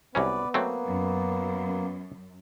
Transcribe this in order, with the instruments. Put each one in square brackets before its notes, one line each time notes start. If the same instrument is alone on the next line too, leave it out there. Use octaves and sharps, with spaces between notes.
[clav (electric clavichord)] C2 F#3 C#4 [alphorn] B3 [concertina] B4 D5
[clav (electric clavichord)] F#3 A3 C4 [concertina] A#3
[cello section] F#2